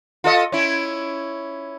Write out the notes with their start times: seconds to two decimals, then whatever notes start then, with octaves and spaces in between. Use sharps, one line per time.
0.24 F4 A4 D#5
0.52 C#4 E4